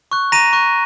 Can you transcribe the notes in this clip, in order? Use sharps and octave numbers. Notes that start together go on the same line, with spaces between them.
C#6 F#6
A#5 A#6 D#7
C#6 F#6